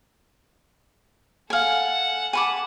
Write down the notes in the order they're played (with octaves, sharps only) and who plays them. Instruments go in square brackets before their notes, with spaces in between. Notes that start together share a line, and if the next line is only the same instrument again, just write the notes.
[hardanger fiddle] A4 F#5 [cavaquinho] F5 G#5
[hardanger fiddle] F#5 A5 [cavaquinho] G#5 B5 D6